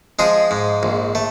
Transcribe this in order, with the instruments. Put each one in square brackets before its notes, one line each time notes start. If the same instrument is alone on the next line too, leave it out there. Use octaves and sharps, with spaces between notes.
[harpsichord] F3 G#3 G#4
G#2
A#1
A3